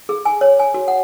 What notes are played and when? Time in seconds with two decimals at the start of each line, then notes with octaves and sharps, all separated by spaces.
0.09 G#4
0.25 G#5
0.41 C#5
0.59 G#5
0.74 F#4
0.88 F#5